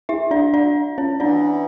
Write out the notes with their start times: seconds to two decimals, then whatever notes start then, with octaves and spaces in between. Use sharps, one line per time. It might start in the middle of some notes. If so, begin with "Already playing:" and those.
0.09 E4 E5
0.31 D4 D5
0.54 D4 D5
0.98 C#4 C#5
1.20 E3 B3 D4 E4 D5